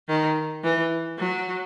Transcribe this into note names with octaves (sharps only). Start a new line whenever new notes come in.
D#3
E3
F#3